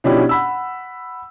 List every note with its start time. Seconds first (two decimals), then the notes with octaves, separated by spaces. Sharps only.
0.04 B2 F3 C#4 D4 E4 G4
0.29 F#5 B5 E6